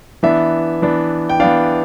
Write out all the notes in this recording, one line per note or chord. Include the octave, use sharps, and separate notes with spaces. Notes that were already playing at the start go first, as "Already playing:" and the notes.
E3 B3 D4 E5
E3 B3 D4
G5
E3 B3 D4 F5